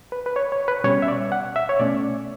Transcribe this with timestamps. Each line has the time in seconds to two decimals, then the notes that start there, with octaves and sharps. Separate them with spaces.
0.12 B4
0.26 B4
0.36 C#5
0.52 C#5
0.68 B4
0.84 B2 G3 C#4 C#5
1.02 E5
1.08 D5
1.32 F#5
1.56 E5
1.69 C#5
1.80 B2 A3 C#4 D5